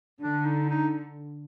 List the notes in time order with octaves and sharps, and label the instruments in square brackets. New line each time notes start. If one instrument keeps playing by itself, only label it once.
[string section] D3 [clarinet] D4
[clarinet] D#4
D#4